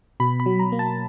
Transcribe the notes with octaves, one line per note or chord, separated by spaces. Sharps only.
B2 B5
B5
F#3
A#5
A#3
A5